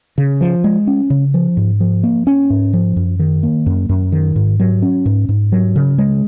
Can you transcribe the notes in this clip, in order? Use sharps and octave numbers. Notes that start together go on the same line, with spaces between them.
C#3
F3
G#3
C#4
C#3
F3
G#2
F3
A#3
C#4
G#2
F3
F#2
D#3
A#3
F#2
F#2
D#3
G#2
F#3
C#4
G#2
G#2
F#3
C#3
G#3